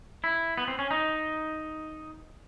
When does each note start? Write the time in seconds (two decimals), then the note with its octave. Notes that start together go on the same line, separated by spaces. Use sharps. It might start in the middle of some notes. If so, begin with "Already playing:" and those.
0.24 E4
0.57 B3
0.68 C4
0.79 C#4
0.91 D#4